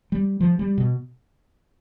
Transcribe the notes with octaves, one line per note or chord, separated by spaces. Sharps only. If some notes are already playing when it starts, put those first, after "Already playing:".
G3
F3
G3
B2